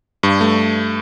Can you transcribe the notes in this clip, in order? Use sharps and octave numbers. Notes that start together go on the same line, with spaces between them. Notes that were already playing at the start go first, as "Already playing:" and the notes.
G2
A3